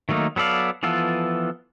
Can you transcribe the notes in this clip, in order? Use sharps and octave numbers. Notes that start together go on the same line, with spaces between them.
D#3 F#3 A3 A#3 D#4
F#3 B3 A4 D5 F5
E3 F3 B3 F4 A4